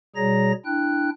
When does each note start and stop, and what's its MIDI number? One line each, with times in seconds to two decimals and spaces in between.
0.16 0.52 47
0.16 0.52 55
0.16 0.52 68
0.16 0.52 73
0.16 0.52 82
0.16 0.52 94
0.66 1.10 62
0.66 1.10 64
0.66 1.10 79
0.66 1.10 90